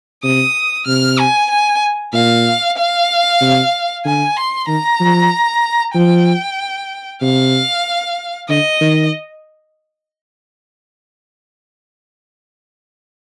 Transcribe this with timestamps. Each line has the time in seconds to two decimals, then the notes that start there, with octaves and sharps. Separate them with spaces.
0.23 C3 D#6
0.87 C3 F6
1.19 G#5
1.50 G#5
2.13 A#2 F5
2.77 F5
3.41 C3
4.05 D3 G#5
4.37 C6
4.68 D#3 A#5
5.00 F3
5.95 F3 G5
7.22 C3 F5
8.49 D3 D#5
8.81 D#3